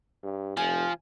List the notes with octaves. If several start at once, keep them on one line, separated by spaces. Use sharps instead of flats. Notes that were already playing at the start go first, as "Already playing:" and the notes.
G2
F1 F3 G#5